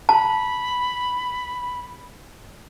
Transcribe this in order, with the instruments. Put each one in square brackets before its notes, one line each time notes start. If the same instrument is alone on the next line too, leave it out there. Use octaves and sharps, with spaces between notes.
[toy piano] A5 [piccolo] B5